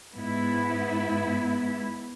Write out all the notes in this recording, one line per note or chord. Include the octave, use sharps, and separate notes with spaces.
G#2 B3 E4